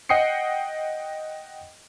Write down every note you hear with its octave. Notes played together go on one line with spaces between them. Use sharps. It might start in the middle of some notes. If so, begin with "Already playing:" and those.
D#5 F#5 G5 D#6 C7 C#7